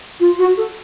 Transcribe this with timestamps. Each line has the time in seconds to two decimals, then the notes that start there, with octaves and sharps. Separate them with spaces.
0.20 F4
0.38 F#4
0.57 A4